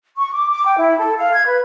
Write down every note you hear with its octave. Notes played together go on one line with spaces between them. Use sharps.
C#6
D6
D6
G5
E4
A4
F5
G#6
B4